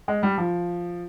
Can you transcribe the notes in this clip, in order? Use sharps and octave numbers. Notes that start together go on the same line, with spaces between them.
G#3
G3
F3